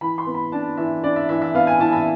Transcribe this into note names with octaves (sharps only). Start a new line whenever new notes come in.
E3 B5
C6
B3
B5
D4 A5
E3 E5
D4 D5
E5
E3 E5
E5
B3 F5
G#5
E3 A5
E5